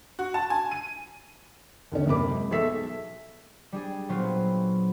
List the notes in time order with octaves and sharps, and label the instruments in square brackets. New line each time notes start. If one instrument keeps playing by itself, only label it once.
[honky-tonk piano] F#4
A5
G#5
D#7
[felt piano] D#2 D3 C#4
F#2 C3 A#4 B5 D6
G#3
B1 G#4 A4 E5 E6 B6
[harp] G3 D4 G#4
A#2 F#3 B3 C4 F4